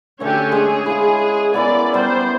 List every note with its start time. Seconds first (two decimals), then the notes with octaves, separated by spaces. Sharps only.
0.20 D3 A3 C#4 G4 C#5
0.52 G#3 C#4 G#4
0.86 E4 F5
1.54 B3 E4 A#4 D5
1.94 G3 B3 C5